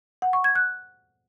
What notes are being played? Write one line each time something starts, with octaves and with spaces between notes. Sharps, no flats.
F#5
C#6
G#6
F#6